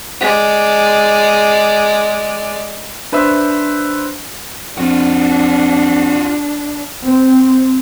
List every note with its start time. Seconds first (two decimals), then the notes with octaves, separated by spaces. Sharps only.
0.21 G#3 D5
3.12 D4 B4 C5 E5 E6
4.78 F2 D4 F4 F#4
7.03 C4